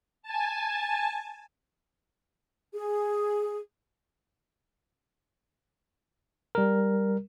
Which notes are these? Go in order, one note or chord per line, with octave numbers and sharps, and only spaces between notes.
G#5 A5
G#4
G3 A#4